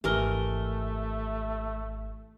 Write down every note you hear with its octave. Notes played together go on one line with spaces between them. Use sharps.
G#1 E3 A3 G4 A#4 D#5 F6 G7